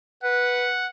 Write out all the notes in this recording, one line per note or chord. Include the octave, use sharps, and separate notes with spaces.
B4 F#5